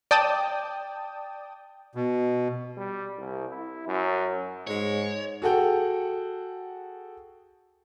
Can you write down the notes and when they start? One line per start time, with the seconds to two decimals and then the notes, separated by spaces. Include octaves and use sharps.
0.11 D5 G5 A5 D#6
1.95 B2
2.77 G3
3.18 C2
3.49 E4
3.87 F#2
4.67 G#2 G#3 C#5
5.42 F#4 G#4 A4 F#5 G5